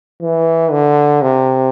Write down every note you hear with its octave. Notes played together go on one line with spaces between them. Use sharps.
E3
D3
C3